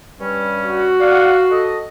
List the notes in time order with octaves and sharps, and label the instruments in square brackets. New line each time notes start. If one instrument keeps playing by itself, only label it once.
[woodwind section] G2 G3 C#4
[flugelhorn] F#4
[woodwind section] D5 F5 F#5
A4 D#5